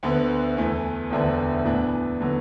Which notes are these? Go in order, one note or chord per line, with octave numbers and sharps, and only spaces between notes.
D2 D3 B3
E2 E3 A3
E1 D2 D3 B3 D4
A2 E3 B3 D4
D3 F#3 B3